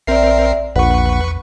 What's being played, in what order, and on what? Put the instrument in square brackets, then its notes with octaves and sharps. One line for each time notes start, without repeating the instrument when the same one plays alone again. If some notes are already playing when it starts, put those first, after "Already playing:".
[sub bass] A#1 [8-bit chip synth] C4 A#4 C7 [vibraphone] D5 E5
[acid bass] A#1 [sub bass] E2 [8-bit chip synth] B4 C#6 [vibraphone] F#5